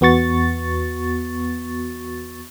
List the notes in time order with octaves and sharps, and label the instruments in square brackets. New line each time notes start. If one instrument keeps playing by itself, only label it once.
[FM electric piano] E2 B3 F#4 C#6 A6